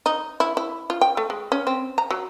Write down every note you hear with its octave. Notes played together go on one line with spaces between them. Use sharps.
D#4
E4
E4
F4
G5
A3
G#3
C#4
C4
A#5
F#3